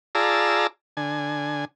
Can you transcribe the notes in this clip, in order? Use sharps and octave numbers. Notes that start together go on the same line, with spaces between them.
F4 G#4 D5 A5 A#5 E6
D3 G#5